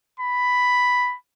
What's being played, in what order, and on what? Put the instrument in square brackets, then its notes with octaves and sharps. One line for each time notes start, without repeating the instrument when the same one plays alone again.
[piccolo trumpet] B5